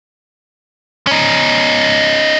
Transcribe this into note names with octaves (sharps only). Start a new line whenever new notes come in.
C#4 D#4